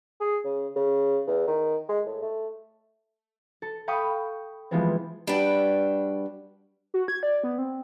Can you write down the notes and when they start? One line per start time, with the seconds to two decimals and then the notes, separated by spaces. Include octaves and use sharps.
0.21 G#4
0.44 C#3
0.76 C#3
1.27 E2
1.47 D#3
1.89 G#3
2.06 A2
2.22 A3
3.62 A4
3.88 F5 G5 B5 C#6 D#6 F6
4.71 E3 F3 G3 G#3 B3 C4
5.27 G3 D4 F#4 B4 G5
6.94 F#4
7.08 G#6
7.23 D5
7.44 B3
7.58 C4